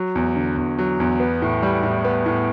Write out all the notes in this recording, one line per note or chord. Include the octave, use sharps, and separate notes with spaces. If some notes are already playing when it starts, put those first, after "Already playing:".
Already playing: F#3
E2
D3
E2
F#3
E2
B3
A2
G3
A2
B3
A2